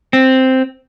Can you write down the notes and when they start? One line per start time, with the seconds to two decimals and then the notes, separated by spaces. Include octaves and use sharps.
0.13 C4